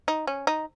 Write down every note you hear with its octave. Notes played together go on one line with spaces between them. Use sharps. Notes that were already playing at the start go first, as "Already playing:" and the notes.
D#4
C#4
D#4